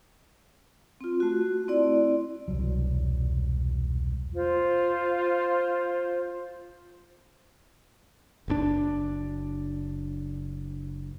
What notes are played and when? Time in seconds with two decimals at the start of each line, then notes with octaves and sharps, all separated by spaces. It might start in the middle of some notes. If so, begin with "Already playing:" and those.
1.01 C4 F4
1.20 A3 F#4
1.68 C4 E4 D5
2.48 E1 C2 F#3
4.34 F4 C5
8.48 F#1 C3 D4